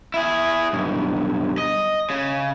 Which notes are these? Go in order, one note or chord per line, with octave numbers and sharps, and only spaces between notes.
E4 G#4
B1 G2
D#5
C#3